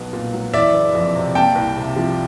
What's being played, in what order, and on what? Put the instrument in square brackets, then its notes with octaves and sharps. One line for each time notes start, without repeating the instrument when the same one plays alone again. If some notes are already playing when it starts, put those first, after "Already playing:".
Already playing: [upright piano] B1 F#3 B3
A#2
F#3
[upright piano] E3 [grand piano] D5 E5
[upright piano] F#1
F2
C3
[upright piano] A#3 [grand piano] G5 A5
[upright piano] C2
C3
F3